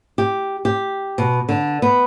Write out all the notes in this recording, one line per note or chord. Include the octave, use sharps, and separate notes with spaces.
G4
G4
B2
D3
B3